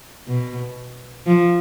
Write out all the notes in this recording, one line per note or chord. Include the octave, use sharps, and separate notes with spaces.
B2
F3